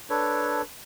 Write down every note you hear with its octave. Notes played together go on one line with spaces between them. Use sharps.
D4 A4 B4 C#5